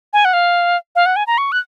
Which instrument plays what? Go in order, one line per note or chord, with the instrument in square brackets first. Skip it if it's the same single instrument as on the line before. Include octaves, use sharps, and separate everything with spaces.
[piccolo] G#5
F#5
F5
F5
F#5
G#5
A#5
C#6
F#6